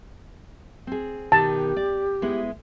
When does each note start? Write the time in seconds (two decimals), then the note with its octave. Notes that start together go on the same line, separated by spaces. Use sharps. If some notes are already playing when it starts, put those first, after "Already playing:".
0.87 C4 G#4
1.32 B2 D#3 G4 A5
1.76 D5
2.22 G#3 B3 E4